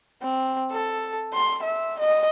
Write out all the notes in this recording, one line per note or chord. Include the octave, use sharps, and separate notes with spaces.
C4
A4
C6
E5
D#5